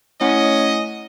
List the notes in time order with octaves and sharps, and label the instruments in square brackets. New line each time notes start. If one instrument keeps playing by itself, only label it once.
[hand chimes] A3 E4 F#5 [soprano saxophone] C#4 [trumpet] D#5